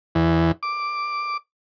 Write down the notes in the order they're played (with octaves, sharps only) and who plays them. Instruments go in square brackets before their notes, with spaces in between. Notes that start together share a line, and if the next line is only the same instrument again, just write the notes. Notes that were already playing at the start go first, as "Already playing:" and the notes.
[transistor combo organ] E2
D6